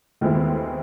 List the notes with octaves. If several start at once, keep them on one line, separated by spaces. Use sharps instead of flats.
D#2 D#3 G#3 A3 C4 E4
B3